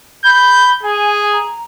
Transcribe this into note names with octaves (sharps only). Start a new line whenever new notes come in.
B5 G6
G#4 G#5
A#5